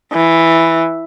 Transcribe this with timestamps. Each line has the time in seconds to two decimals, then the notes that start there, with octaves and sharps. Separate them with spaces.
0.12 E3